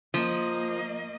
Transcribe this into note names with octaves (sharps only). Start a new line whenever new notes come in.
F3 A#3 D#5